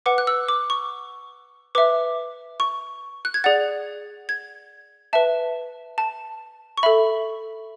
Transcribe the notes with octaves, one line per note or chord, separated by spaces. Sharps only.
B4 F#5 D6
F#6
E6
D6
C#6
B4 E5 D6
C#6
F#6
G#6
G#4 D5 F#5 A6
G#6
B4 E5 A5
A5
C#6
A4 E5 B5